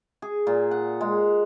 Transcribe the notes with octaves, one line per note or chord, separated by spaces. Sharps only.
G#4
A#2
F#5
G#3